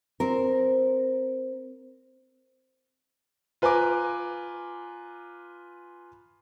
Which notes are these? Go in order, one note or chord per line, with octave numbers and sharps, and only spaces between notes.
C4 A#4
F4 B4 G#5 A#5 D6